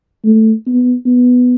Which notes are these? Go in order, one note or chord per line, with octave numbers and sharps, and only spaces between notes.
A3
B3
B3